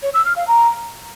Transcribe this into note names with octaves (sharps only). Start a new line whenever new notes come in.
C#5
E6
F6
F5
A#5